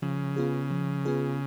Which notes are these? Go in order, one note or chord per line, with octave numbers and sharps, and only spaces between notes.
C#3 F3
B3 F4 G#4
F3
B3 F4 G#4